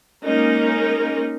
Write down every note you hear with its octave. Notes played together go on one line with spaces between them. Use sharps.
G#3 A#3 C#4 D#4 A#4